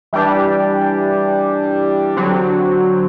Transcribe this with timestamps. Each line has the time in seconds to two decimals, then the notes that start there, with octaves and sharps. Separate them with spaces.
0.13 E3 G3 D4 G4
2.17 D3 F#3 C4